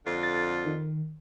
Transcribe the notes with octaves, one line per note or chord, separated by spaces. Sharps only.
F2 D3 F4
A6
D#3